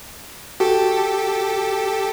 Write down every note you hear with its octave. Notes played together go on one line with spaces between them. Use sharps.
F#4 G4 A4